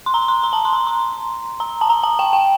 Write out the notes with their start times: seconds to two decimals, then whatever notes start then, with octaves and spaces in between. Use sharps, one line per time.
0.06 C6
0.14 A#5
0.28 C6
0.44 A#5
0.53 A5
0.65 C6
0.73 A#5
0.87 C6
1.60 A#5
1.81 A5
1.89 A#5
2.03 A5
2.19 G5
2.33 G5